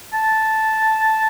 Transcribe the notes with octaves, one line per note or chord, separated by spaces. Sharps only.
A5